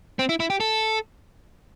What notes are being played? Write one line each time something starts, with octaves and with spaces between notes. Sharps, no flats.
C4
E4
E4
G4
A4